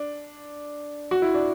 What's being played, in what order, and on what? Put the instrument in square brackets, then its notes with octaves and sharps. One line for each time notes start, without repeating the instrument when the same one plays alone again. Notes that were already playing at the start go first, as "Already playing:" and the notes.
Already playing: [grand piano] D4
F#4
E4
D4